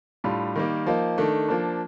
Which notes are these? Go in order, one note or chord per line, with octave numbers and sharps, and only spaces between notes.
A2 G3 D4 F4
D#3 G3 A#3
F3 A#3 D#4
D#3 A3 D4
F3 A#3 D4